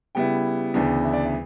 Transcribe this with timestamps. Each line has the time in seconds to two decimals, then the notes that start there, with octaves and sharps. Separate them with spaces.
0.15 C#3 G3 B3 E4 G5
0.74 D2 C#3 E3 B3 D4
1.04 E5
1.13 D5
1.24 E5